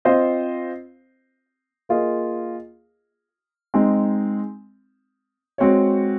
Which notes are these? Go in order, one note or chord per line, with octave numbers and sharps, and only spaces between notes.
C4 F4 C5 D#5
A#3 F4 G#4 D#5
G#3 C4 D#4
G#3 C4 F#4 C#5